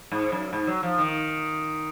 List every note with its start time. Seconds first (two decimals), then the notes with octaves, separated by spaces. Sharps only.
0.11 G#2
0.32 F#2
0.53 G#2
0.67 F#3
0.83 F3
0.98 D#3